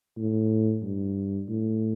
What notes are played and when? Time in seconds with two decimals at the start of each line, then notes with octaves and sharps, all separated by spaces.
0.17 A2
0.82 G2
1.49 A2